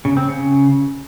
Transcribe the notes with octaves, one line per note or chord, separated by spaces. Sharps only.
C#3
C4
C#3